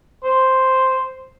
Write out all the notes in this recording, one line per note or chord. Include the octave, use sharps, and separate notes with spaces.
C5